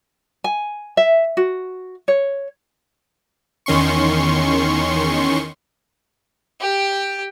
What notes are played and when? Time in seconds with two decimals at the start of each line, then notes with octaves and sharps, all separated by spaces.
0.44 G#5
0.97 E5
1.37 F#4
2.08 C#5
3.66 E2 D#3 C#4 C6 C#6
6.60 G4 G5